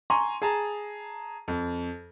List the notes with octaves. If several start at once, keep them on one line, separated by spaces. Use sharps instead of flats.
G#5 A#5 C6 C#6
G#4 A5 A#5
F2